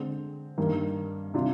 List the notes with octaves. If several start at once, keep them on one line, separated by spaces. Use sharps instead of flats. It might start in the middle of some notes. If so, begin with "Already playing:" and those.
Already playing: D3 G#3 C4
G2 D#3 A#3
C3 G3 D4 F4